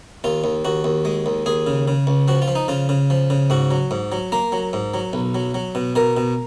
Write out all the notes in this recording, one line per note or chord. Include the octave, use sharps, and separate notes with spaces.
D#2 F4
D#2
D#2 F#4
D#2
G#3
D#2
D#2 G#4
C#3
C#3
C#2
F3 F#4
F4
F3
D#4
C#3 F4
C#3
F3
C#3
G#2 F#4
F#3
G#2
F#3
A#3 A#4
F#3
G#2
F#3
B1
F#3
F#3
B2
B2 A#4
B2